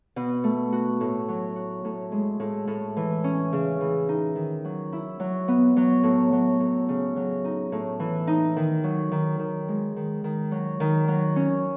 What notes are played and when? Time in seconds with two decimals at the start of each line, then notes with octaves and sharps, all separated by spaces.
0.16 B2
0.44 A3
0.72 F#4
1.01 A2
1.28 F#3
1.56 F#4
1.85 A2
2.12 G#3
2.40 A2
2.67 A2
2.97 E3
3.24 C#4
3.53 C#3
3.81 E3
4.09 D#4
4.36 D#3
4.65 F#3
4.93 E4
5.20 F#3
5.48 B3
5.77 F#3
6.03 A2
6.33 F#3
6.60 A2
6.89 C#3
7.16 F#3
7.45 D#4
7.72 A2
8.00 E3
8.27 D#4
8.56 D#3
8.84 F#3
9.12 D#3
9.39 D#3
9.68 G#3
9.96 D#3
10.24 D#3
10.51 F#3
10.80 D#3
11.08 F#3
11.36 C#4